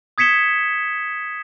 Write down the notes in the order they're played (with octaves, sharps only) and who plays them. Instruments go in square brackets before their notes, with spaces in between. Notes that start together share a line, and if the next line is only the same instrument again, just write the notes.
[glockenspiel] D#6 G#6 B6 C#7 E7 G7